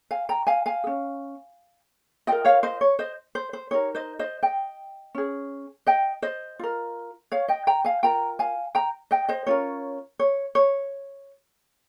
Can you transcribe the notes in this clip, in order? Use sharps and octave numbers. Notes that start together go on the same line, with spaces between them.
F5 G#5
G5 A#5
F5 G#5
F5 G#5
G#4
C#4
F4 A#4 D#5 G5
C#5 F5
C5 D#5
C#5
C5 D#5
C5
C5
D#4 G4 A#4 C#5
C5 D#5
C5 D#5
D#5 G5
C#4 G#4
D#5 G5
C5 D#5
F4 A#4
C#5 F5
D#5 G5
G5 A#5
F5 G#5
F4 A#4 G5 A#5
F5 G#5
G5 A#5
D#5 G5
C5 D#5
C#4 F4 A#4 C#5
C#5
C#5